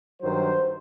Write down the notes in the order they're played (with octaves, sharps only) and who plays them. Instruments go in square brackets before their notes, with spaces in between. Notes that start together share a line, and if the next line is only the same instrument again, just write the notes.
[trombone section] G2 D#3 F#3 C5